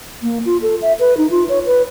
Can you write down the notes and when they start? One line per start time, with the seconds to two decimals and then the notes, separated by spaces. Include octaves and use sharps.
0.22 A#3
0.46 F4
0.62 A4
0.82 E5
0.99 B4
1.17 D#4
1.31 F4
1.49 C#5
1.66 B4